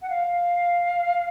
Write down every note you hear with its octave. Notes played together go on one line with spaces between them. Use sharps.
F#5
F5